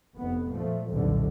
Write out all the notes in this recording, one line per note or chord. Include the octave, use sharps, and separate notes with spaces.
F1 F2 B3
A#2 F3 A3
F1 B1 F2 A#2 D3